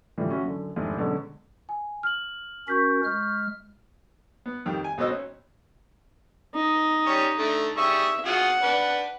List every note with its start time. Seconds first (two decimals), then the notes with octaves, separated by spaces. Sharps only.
0.18 A2 C#3 E3 F3 G3
0.30 C#4 E4 F#4
0.44 F#2 D3
0.76 F1 G#2 D4 E4
0.97 B2 D3 F#3 G#3 C#4
1.69 G#5
2.03 F6 F#7
2.68 C#4 F#4 A#4 C#6 G6 B6
3.05 G#3 F6
4.46 B3
4.65 F2 D#3 G3
4.84 G#5
4.98 B1 B3 C4 F#4 D#5 E6
5.11 C#4
6.55 D#4
7.06 G3 C#4 C#5
7.38 D3 A3
7.77 G3 G#4 E5 C#6
8.26 F4 F#4 G#4 F#5
8.63 D4 B4